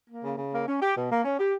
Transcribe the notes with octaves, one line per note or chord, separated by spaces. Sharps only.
A#3
C#3
C#3
A#3
C#4
G4
B2
A#3
C#4
G4